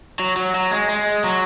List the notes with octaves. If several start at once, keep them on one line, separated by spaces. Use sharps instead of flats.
F#3
F#3
F#3
G#3
G#3
F#3